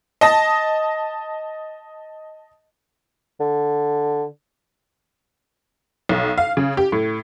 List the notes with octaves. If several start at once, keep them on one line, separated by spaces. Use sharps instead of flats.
D#5 A5 A#6
D3
B1
F5
C#3
G4
A2